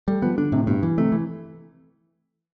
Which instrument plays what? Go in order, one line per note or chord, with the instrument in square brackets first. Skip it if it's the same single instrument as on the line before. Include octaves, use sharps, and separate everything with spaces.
[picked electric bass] G3 [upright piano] A3
[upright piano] F3 [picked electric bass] B3
[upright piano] D3 [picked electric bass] D4
[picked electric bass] A2 [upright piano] C3
[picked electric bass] G2 [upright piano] B2
[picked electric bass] E3
[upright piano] C3 [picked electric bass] A3
[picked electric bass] E3